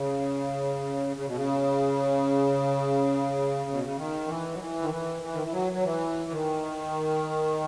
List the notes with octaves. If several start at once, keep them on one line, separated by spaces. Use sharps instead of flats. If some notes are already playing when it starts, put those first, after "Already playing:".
Already playing: C#3
C#3
B2
C#3
B2
C#3
D#3
E3
F#3
E3
D#3
E3
E3
D#3
E3
F#3
F#3
E3
D#3